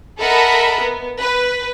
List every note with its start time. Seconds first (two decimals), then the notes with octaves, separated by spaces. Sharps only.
0.20 A4 A#4 D#5 E5 F#5 B5
0.82 B3
1.19 B4